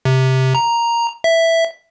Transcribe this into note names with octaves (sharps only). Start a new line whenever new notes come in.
C3
A#5
E5